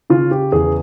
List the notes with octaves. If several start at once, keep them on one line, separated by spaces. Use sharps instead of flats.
C#3 F4
G4
E2 G#4